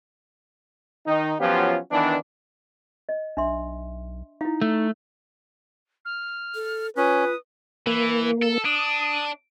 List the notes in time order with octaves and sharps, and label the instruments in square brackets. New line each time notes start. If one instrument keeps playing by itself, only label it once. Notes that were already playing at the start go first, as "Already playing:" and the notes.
[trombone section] D#3 D#4
F3 F#3 B3 C#4 F4 G4
D#3 E3 B3 D4
[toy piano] D#5
[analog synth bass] B1 [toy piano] D4 E5 C6
[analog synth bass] D#4 [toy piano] E4 F5
[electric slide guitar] A3
[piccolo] F6
[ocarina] A4
[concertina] C#4 [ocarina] F4 [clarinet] B4 [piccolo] D#6
[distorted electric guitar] E3 [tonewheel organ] A#3
[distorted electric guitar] A4
[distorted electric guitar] D4 [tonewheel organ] D#6